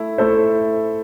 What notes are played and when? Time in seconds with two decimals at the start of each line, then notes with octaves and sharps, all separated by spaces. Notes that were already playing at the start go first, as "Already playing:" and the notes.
Already playing: A3 E4
0.18 A3 E4 A4 C5